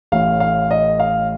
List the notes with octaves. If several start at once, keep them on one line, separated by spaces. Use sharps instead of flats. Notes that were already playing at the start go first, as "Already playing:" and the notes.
A1 A2 F5
F5
D#5
F5